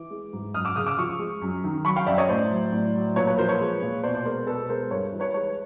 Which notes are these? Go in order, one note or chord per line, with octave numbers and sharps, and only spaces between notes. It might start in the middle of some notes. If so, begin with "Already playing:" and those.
Already playing: E3 D6
G#3
G#2
F#2 D#6 F6
D6 E6
C#3 D#6 F6
D6 E6
F3 C#6 D#6
G#3
F#2
D#3
F#3 B5 C#6
F5 G5
F#2 D5 E5
C#5 D#5
A2 C5 D5
F#3
A2
F#3
A#2 B4 C#5
B4 C#5
F3 A#4 C5
B4 C#5
G#3
A#2
B2 C5 D5
C5 D5
G#3 A#4 C5
B2 A4 B4
G#3 A#4 C5
G2 B4 C#5
E3
B4 C#5
G#3 B4 C#5